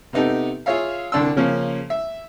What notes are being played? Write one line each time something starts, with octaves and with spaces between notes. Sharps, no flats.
C3 B3 D#4 G4 A4
F4 G#4 C#5 E5 F5
C2 D3 D4 C6 E6
C#3 F3 A#3 C#4
E5